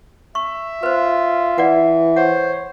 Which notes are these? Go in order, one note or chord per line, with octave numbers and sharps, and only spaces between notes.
E5 C#6
F4 B4 C5
E3 D5 F#5
C5 C#5 F#5